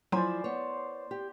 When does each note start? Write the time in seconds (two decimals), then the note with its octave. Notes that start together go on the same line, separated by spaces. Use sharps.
0.12 F3 F#3 E4 C5 D5 G#5
0.44 B3 C#5
1.11 G4